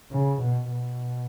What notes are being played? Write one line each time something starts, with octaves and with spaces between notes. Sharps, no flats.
C#3
B2
B2